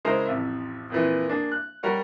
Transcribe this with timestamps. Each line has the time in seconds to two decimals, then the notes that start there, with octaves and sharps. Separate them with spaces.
0.05 C#3 G#3 E4 G#4 A#4 C5
0.26 A1 F2 E5
0.90 F2 A#2 E3
1.28 A#3 D4 G#4
1.52 F#6
1.83 G3 A#4 C#5 F#5